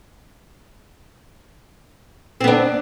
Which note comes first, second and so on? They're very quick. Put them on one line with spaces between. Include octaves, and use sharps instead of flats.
C4 B3 D4